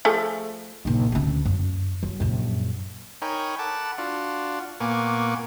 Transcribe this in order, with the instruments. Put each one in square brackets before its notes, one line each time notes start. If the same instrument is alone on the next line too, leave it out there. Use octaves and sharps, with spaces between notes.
[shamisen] F3 A3 G#4
[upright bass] A#1 D#4
D2 C#4
F#2
F#3
A#1 F#2
[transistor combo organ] D#4 A#4 C#5 G5 G#5 B5
A4 F#5 A5 B5 D6
D4 F4 F#4
A#2 A#3 B3 G#5 C#6 D6